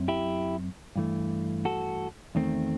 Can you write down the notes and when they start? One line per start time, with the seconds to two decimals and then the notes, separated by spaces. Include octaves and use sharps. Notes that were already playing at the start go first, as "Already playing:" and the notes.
Already playing: F#2 F#3 C4
0.08 E4 G4
0.96 G2 E3 A3
1.65 F#4 A4
2.35 E2 D#3 A3 C4